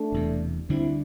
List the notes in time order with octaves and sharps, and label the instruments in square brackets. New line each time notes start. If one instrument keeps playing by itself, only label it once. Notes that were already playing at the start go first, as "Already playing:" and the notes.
Already playing: [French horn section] A3 D4
[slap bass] E1 E2 C3
[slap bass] D2 D3 G3 D4 [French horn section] C4 E4